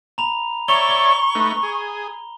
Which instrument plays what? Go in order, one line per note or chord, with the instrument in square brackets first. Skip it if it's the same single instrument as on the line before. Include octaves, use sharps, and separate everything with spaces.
[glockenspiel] A#5 B5 F7
[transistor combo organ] C#5 D5 E5 [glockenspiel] A#5 F7 G7 [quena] C#6
[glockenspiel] G7
[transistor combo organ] A3 D#4 B4
G#4